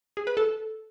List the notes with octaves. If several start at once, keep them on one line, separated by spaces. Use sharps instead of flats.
G#4
B4
A4